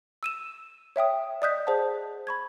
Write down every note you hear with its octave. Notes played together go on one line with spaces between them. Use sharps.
E6 D#7 E7
C#5 E5 G5 D#6
D5 D#5 D#6 F#6 G6 B6
G#4 C5 D5 F#5 A5
B5 C#6 G#6